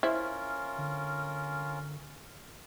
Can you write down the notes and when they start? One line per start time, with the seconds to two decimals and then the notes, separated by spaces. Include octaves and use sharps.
0.03 C#4 E4 F4 A#4 C5
0.78 D3